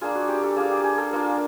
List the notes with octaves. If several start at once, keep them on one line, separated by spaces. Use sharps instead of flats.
A#3 D4 F4 G#4
F#4
G4
A4
A#3 D4 F4 G#4
G4
G#4
A4
A#3 D4 F4 A#4